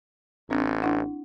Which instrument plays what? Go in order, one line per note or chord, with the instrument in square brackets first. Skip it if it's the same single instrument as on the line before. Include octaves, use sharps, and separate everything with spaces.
[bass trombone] A1 [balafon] C4 D4
[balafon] D4 E4 F#5